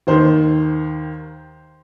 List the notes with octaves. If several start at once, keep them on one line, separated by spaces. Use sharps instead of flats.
D#2 D#3 C5